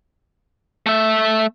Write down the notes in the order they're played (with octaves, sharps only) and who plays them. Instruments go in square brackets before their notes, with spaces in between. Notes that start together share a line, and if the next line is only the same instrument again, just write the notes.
[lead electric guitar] A3 E5